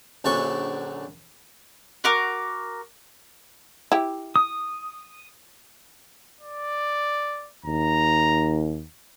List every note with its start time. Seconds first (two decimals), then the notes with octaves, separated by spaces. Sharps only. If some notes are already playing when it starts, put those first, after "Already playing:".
0.24 A#1 F#2 D3 A4 C#6
2.04 F#4 A#4 D6
3.92 E4 G4
4.36 D#6
6.41 D5
7.65 D#2 A#5